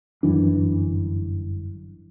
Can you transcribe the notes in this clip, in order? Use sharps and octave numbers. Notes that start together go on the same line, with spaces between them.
G1 F#2 E3 D4